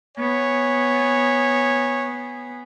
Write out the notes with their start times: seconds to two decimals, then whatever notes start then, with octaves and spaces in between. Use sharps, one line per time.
0.17 B3 G#4 C#5